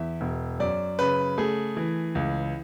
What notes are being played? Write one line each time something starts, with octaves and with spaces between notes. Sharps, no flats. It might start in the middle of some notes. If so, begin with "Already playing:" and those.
Already playing: E2 E5
E1
F#2 D5
C#3 B4
A3 G#4
E3
C#2